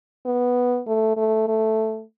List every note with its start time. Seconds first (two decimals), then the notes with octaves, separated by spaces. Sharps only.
0.26 B3
0.88 A3
1.17 A3
1.48 A3